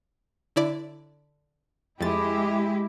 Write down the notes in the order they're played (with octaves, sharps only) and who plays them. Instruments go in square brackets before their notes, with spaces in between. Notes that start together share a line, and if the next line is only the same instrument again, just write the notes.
[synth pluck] D3 E4 D5
[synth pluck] F2 A6 [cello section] G#3 E4 G4